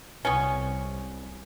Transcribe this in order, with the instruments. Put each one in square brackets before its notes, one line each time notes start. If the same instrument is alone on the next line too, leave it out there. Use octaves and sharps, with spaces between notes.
[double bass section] C2 [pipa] B3 C#4 [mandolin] G#5 C#6